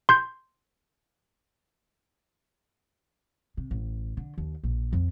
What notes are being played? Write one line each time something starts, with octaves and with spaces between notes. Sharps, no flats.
C6 G6
C3
A1
D3
D#2
A#1
F2